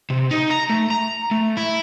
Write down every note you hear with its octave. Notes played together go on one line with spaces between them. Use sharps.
C3
D#4
A#5
A3
A#5
A3
E4